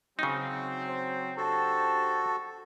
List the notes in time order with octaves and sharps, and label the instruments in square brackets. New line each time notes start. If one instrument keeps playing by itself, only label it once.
[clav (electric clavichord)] C#3 D#4 [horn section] F#3 C4
[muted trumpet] C5
[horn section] D4 G4 C5 [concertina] F#4 A4 [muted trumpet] A5